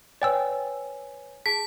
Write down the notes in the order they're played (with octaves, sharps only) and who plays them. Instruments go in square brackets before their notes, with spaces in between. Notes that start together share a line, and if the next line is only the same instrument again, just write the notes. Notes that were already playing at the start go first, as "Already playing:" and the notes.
[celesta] B4 C#5 G#5 [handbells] D5 G5 E6
[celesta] G#4 A5 D7 [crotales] B6